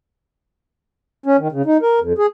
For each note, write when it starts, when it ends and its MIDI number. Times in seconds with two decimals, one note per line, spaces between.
1.26 1.37 61
1.38 1.48 51
1.52 1.62 49
1.66 1.77 63
1.82 2.00 70
2.00 2.13 41
2.18 2.26 68